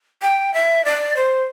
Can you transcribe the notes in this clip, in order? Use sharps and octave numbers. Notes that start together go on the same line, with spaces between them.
G5
E5
D5
C5